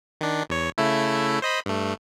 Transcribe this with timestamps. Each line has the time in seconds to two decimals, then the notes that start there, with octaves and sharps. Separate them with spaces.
0.21 D#3 D4
0.50 E2 C#5
0.78 C#3 A3 E4
1.42 C5 D#5 B5
1.66 G2 A3